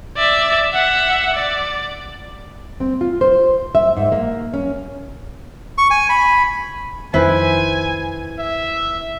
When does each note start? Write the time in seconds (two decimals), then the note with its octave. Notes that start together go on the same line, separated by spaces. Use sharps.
0.17 D5 E5
0.72 E5 F#5
1.34 D5
2.80 C4
3.01 F4
3.21 C5
3.75 E5
3.97 G#2
4.12 A#3
4.54 C#4
5.78 C#6
5.91 G#5
6.09 B5
7.14 F2 D#3 E4 B4 C5 G#5
8.38 E5